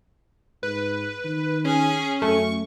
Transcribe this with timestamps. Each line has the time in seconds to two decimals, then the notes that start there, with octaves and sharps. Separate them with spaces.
0.63 G#2 B4
1.25 D#3
1.65 C#4 G#4
2.22 F#2 A3 C#6